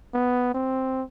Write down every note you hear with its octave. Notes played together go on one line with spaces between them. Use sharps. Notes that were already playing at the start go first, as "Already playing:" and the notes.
B3
C4